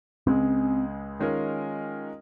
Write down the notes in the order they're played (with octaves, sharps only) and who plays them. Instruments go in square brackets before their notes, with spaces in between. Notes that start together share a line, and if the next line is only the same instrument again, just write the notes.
[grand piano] C#2 C#3 G#3 [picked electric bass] C4
[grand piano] D#3 G#3 C#4 F4 A#4